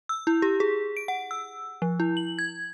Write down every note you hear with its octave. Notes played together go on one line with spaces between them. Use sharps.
E6
E4
G4
G#4
D7
F#5
E6
F3
E4
F#7
G#6